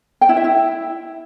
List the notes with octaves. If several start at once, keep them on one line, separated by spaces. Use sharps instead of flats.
G5
E4
E5
E4